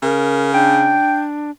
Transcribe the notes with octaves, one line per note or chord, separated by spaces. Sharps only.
C#3 A#4
D4 G5